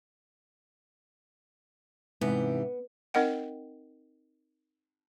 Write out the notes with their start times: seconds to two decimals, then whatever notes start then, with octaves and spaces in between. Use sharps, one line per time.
2.21 G#2 C3 E3 B3 G4
3.14 C4 D#4 A#4 D#5 F#5 G5